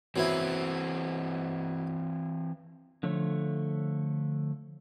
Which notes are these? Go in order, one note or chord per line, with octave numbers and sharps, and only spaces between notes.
E3 F#3 B3 C4 E4
D3 F3 A3 C#5